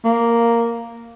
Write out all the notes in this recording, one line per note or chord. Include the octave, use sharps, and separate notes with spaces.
A#3